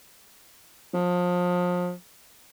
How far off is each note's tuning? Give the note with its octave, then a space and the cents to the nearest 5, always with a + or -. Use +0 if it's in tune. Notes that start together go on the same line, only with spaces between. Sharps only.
F3 +30